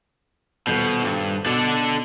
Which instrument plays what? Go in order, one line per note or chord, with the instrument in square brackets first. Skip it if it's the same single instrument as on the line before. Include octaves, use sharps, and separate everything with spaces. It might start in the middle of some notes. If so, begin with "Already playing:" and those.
[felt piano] D#1 G6 [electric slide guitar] B2
[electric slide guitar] G2
[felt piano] B2 [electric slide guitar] D4 A4 D5